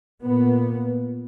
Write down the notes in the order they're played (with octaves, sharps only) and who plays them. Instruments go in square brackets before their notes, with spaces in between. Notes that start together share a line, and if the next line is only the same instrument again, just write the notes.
[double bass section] A#2 B3